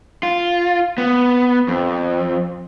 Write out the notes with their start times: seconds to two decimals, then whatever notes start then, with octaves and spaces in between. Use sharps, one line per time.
0.23 F4
0.98 B3
1.68 F2